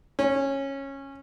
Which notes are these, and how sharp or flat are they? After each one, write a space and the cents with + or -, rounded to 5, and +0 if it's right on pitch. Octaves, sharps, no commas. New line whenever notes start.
C#4 -15